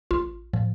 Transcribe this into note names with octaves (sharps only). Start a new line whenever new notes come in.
A1 F4
A2 F3